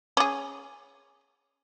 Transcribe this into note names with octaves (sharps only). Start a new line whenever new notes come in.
C#4 G#4